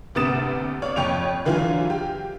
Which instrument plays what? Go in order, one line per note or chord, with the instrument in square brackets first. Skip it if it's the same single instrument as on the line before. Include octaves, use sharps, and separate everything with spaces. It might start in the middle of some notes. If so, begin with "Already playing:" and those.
[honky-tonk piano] D2 C3 B3 D#6 A6 E7
C#5 D5 F5
F2 C#5 G5 F7
D3 E3 F#3 F4
G4